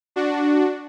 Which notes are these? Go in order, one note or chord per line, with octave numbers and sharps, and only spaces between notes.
D4 F#4